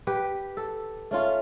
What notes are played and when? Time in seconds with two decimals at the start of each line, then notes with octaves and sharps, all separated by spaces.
0.07 G4 B4
0.57 A4
1.11 A3 C#4 F4